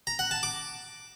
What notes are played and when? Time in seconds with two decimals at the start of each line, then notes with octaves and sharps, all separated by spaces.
0.07 A#5
0.19 F#5
0.31 A5
0.43 D6